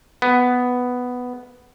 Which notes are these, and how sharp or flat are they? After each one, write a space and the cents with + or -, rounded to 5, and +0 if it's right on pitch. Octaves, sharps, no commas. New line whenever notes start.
B3 +5